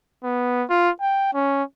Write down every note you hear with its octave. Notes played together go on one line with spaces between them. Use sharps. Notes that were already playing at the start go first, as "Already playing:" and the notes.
B3
F4
G5
C#4